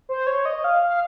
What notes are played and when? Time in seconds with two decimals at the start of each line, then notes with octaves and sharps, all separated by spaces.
0.09 C5
0.27 C#5
0.46 D#5
0.64 F5
0.83 F5